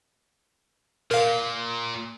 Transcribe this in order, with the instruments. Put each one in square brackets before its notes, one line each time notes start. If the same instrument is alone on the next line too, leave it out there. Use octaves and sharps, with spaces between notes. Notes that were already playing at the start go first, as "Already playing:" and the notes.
[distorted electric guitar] A#2 [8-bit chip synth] A#4 F5